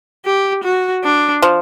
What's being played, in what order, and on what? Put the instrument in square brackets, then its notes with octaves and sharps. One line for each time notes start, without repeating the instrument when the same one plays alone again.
[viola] G4
F#4
D4
[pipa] F3